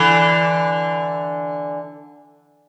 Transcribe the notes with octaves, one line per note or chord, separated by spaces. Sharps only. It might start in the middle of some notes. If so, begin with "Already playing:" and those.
Already playing: D3 E3